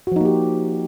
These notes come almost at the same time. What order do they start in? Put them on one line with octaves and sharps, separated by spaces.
F#4 F3 D#4 A#3 G4